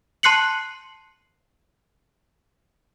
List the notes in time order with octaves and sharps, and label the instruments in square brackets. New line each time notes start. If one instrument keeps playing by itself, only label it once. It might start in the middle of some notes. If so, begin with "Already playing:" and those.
[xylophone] A5 C6 F#6 C7 C#7 F#7